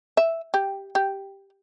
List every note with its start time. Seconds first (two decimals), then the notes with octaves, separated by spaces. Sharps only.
0.17 E5
0.54 G4
0.95 G4